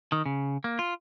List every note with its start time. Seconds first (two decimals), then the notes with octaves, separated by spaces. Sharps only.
0.12 D#3
0.26 C#3
0.64 A#3
0.79 F4